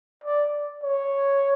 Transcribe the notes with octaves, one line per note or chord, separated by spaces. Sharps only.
D5
C#5